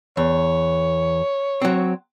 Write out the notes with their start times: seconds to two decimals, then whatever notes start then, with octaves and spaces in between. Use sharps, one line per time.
0.17 E2 C#5
1.62 F#3 C4